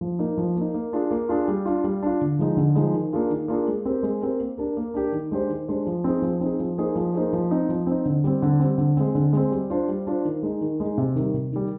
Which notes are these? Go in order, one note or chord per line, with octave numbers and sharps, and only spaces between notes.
F3
A#3 D#4
F3
A#3 D#4
A#3
D4 F4 G#4
A#3
D4 F4 G#4
G3
D4 F4
G3
D4 F4
D3
F3 G#3 D#4
D3
F3 G#3 D#4
D#3
A#3 D4 F4 G#4
D#3
A#3 D4 F4 G#4
G#3
C4 G4 A#4
G#3
C4 G4 A#4
A#3
D4 G4 A#4
A#3
D4 G4 A#4
D#3
G#3 D4 G4 C5
D#3
G#3 D4 G4 C5
F3
C4 D#4 G#4
F3
C4 D#4 G#4
F3
A#3 D#4 G#4 C5
F3
A#3 D#4 G#4 C5
F3
C4 D#4
F3
C4 D#4
D3
G3 C4
D3
G3 C4
D3
G#3 C4
D3
G#3 C4
G3
D4 F4 C5
G3
D4 F4 C5
D#3
G#3 D#4
D#3
G#3 D#4
C3
D#3 G3
C3
D#3 G3